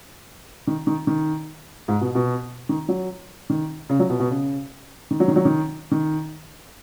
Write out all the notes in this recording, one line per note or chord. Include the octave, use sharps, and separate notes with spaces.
D#3
D#3
D#3
G#2
B2
B2
D#3
F#3
D#3
C#3
F#3
B2
B2
C#3
D#3
F#3
D#3
F#3
D#3
D#3